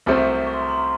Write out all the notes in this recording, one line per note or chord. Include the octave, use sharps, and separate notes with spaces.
C2 C3 F#3 A3 C4 F6
C#6
C6
A#5
C6